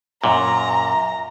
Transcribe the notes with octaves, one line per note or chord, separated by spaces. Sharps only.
F#2 A#2 A#5